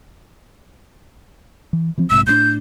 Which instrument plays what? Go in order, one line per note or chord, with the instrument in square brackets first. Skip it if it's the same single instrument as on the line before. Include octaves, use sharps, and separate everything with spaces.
[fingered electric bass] E3
E3 F3 C4
[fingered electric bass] B1 G#2 C3 [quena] E6
[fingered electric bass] A2 F#3 D4 [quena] G6